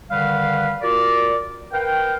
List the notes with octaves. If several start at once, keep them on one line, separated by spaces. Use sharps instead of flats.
D3 D#3 G3 B4 F5
F4 F#4 A#4 D5
A#4 B4 F5 G5